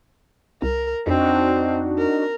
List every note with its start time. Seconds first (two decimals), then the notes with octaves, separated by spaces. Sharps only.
0.62 C2 A#4
1.07 F2 C4 D4 D#4 F#4
1.98 A#4